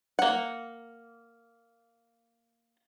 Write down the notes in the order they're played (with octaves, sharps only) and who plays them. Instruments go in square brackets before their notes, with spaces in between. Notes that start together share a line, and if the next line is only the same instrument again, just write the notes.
[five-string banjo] A#3 F#5